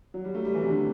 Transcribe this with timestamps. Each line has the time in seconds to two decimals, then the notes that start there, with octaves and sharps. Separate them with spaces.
0.14 F#3
0.24 G3
0.35 A3
0.45 G3
0.55 E3
0.62 C3
0.69 D3